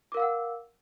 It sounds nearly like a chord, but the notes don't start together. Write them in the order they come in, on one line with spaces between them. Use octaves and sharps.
D6 A#4 F5 E6 F#5